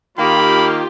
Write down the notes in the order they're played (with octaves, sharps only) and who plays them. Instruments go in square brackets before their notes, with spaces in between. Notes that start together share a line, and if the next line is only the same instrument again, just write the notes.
[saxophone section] D#3 A#3 [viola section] F4 G4 [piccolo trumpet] B5